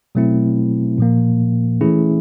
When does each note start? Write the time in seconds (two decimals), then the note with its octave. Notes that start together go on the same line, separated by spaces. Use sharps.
0.15 B2 F#3 A3 C4 E4
0.98 A#2 F3 A#3
1.81 E3 A3 C#4 E4 G#4